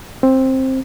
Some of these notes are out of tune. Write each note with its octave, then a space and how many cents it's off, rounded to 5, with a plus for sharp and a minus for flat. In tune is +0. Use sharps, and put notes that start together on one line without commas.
C4 +10